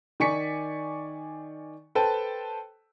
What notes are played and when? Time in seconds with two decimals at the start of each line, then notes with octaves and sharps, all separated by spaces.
0.20 D#3 D5 G#5 C#6 B6 C#7
1.95 A4 B4 C5 G5 A5